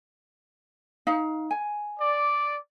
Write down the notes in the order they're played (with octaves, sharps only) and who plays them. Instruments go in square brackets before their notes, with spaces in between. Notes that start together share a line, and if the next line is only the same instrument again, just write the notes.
[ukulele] D#4 F5
G#5
[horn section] D5